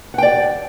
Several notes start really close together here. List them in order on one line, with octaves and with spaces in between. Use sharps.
F#5 G5 D5